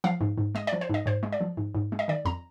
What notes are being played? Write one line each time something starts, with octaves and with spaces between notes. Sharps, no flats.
F3 F5
G#2
G#2
G#3 D#5
D5
F3
C5
G#2 D#5
G#2 C5
G#3
D5
F3
G#2
G#2
G#3
D#5
D#3 D5
F2 A#5